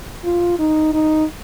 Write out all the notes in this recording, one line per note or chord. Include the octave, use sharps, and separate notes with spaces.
F4
D#4
D#4